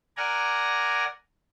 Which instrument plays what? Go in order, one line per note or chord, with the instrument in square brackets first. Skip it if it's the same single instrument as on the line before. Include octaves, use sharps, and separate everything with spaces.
[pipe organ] A#4 D5 F#5 G#5 A#5